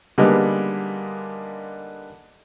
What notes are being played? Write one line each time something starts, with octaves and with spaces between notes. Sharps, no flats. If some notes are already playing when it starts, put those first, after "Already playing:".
D3 G3 G#3 A#3 B3 D#4